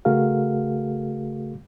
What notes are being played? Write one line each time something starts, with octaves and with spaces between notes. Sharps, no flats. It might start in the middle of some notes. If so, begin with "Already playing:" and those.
C#3 A3 F#4 G#4 A#4 F5